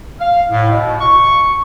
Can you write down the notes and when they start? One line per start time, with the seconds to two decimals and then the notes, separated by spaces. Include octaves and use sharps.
0.20 F5
0.50 A2
0.70 B2
1.00 C#6